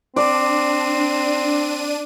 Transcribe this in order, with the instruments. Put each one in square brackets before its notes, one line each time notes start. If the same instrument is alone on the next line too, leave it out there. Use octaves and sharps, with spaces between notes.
[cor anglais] C4 [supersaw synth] D4 D#7 [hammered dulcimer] D5